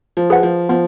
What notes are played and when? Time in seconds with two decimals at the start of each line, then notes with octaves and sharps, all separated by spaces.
0.17 F3
0.30 G#4 B4 F#5
0.43 F3
0.69 F3 B3